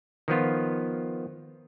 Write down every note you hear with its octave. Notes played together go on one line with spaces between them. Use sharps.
D#3 F3 B3 F4